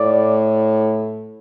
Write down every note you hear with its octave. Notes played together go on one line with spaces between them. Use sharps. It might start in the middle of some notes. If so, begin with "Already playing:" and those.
Already playing: A2 D5